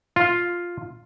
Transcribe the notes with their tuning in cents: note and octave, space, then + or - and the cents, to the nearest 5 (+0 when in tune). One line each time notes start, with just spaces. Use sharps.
F4 +5